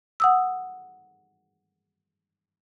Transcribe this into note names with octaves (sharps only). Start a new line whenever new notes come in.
F#5 D#6 E6